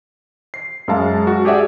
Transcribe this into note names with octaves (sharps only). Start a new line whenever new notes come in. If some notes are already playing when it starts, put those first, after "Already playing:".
C7
F#2 G#3 F5 A5
F#4
G4 G#4 D5 E5 F#5